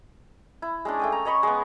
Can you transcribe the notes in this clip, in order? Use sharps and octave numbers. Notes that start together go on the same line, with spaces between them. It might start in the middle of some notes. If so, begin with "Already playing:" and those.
E4
G#3 C#4 D4
A3 G5 D#6
A#5
C#5 D#5 B5 C#6
G#3 B3